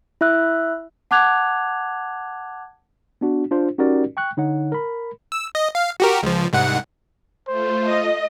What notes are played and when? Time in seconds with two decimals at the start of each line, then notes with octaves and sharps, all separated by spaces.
0.21 E4 E5 E6 F#6
1.11 F#5 A5 D6 F#6 G#6 F7
3.21 B3 D4 F#4
3.51 D4 F4 C5
3.78 C#4 D#4 F#4 G4 A#4 D5
4.17 G5 C#6 F#6
4.37 D3 D#4 C#5 F#5
4.72 A#4 B5
5.32 E6
5.55 D#5
5.75 F5
6.00 F#4 G4 A#4
6.23 C#2 F3
6.53 C2 G#2 F#5
7.48 A3 F4 C5
7.88 D#5